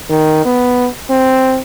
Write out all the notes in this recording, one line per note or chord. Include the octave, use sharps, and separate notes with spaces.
D#3
B3
C4